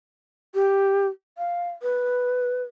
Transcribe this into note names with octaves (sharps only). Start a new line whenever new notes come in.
G4
F5
B4